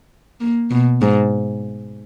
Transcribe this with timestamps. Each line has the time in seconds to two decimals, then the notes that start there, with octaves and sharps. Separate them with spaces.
0.40 A#3
0.70 B2
1.01 G#2